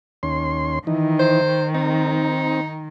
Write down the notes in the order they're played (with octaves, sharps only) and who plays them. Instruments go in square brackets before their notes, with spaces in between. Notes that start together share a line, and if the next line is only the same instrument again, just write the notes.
[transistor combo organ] D#2 C#4 C6
[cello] D#3 [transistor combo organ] E3 D#4
[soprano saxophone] C5
[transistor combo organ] C4 [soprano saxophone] D#4